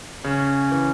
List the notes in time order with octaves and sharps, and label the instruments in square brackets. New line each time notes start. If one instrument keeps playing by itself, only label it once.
[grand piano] C#3 [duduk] C#4
[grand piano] E3